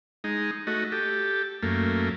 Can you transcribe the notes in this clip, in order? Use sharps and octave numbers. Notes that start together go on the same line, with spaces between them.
G#3 D#4
A3 F#4 D#5
G4 A4
F#2 A3 A#3